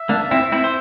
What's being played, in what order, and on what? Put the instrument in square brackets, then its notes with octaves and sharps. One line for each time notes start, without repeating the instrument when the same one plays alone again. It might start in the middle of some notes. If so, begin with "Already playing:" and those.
Already playing: [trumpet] E5
[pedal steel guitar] A#3 D4
C4 E4
C4 E4
C5